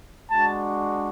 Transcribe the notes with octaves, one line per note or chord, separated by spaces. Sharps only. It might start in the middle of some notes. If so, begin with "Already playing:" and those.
G#3 D4 F#4 A5